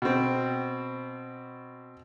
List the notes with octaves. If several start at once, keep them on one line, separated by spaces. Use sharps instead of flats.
B2 C4